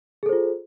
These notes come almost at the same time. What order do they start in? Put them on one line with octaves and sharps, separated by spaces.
G#4 A4 C5 F4